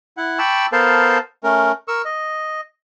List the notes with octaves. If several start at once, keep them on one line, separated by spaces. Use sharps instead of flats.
E4 F#5
G5 A5 B5 C#6 D6 E6
B3 A4 A#4 C5 F5 A5
A3 C#4 A#4
A#4 C#6 E6
D#5